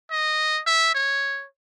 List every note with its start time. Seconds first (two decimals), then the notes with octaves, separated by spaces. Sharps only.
0.11 D#5
0.67 E5
0.95 C#5